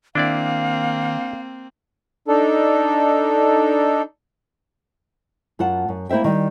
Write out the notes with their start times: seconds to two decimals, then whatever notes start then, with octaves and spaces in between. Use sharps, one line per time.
0.15 D#3 A#3 C4 D4 E4 D5 F5
2.28 D4 D#4 A4
5.59 F#2 F4 F#5 A5
5.89 F#2
6.09 A#3 E4 C5 E5 G5
6.24 D#3 G3